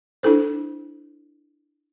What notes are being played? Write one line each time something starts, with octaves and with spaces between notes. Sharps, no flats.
D4 E4 A4 C5